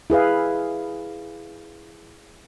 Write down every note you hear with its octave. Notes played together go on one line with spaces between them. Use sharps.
E4 G#4 B4 F5